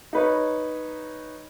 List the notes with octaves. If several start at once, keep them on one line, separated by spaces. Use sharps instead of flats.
D#4 B4 C#5